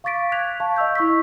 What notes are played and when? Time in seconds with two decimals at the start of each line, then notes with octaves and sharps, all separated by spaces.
0.04 F5 C#6 D6 A6 B6 D7
0.32 F#6 G#6 B6 F7
0.60 F5 A5 C#6
0.76 D#5 C#6 E6 G6
0.95 E4 C#6 E6 B6